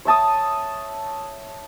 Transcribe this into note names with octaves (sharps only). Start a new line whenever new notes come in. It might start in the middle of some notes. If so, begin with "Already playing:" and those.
C#5 E5 A5 D#6